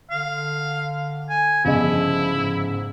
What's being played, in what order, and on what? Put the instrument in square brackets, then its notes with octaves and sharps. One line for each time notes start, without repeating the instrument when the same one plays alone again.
[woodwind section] D3 [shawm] F5
[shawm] G#5
[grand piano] G1 C#3 D#5 [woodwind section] F3 [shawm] E4
[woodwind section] G#2